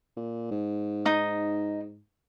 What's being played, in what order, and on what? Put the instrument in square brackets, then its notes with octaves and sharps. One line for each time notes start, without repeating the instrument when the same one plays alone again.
[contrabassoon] A#2
G#2
[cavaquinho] D#4 D#6